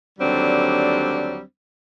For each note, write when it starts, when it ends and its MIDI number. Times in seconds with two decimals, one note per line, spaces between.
0.19 1.42 39
0.19 1.42 50
0.19 1.42 54
0.19 1.42 55
0.19 1.42 60
0.19 1.42 62